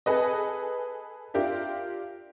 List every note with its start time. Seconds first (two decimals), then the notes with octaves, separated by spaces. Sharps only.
0.06 G#4 A4 B4 D#5
1.34 D4 F4 G4 A#4 E5